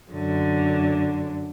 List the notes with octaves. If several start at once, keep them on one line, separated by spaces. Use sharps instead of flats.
F#2 D3